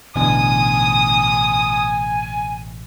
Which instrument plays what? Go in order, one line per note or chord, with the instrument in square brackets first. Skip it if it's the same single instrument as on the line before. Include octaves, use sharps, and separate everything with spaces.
[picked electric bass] A1 B2 D3 [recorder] G#5 [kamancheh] D#6